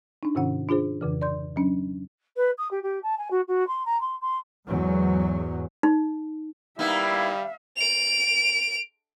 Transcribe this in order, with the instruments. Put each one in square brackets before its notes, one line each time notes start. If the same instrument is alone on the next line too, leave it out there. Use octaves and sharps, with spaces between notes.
[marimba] D4 D#4
G#2 C3 D#3 C#4 F#5
D4 F4 G#4 C5
F2 C#3 E3
D5 C6 G6
F#3 C#4 D4
[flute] B4
D#6
G4
G4
A5
G#5
F#4
F#4
C6
A#5
C6
C6
[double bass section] E2 G#2 F#3
[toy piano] D#4
[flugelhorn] G3 [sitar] A#3 B3 D#4 [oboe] E4 [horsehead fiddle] E5 F5
[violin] D7 F7